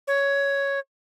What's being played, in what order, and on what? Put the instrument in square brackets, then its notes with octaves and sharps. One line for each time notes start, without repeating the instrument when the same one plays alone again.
[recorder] C#5